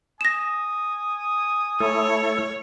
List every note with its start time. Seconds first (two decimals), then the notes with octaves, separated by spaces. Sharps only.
0.21 G#5 D#6 A#6 E7
1.80 A3 E4 A4 C#5